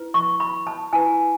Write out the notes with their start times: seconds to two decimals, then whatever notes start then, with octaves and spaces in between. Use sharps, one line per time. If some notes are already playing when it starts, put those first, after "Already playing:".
Already playing: E4 B4
0.14 C#6
0.40 B5
0.67 A5
0.93 E4 B4 G#5